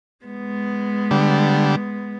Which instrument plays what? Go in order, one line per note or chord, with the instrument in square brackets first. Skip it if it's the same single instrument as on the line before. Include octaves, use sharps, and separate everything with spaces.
[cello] G#3 B3
[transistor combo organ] D3 G3